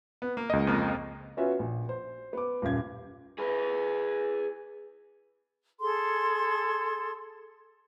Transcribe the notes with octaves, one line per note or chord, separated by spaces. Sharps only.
B3
A#3
C#2 D#5
F2 F3 A#3
B3 C#4 F4 F#4 B4 E5
A#1
C5
B3 D6
D#1 F#2 F5 G#6
G#4 B4
G#4 A4 C6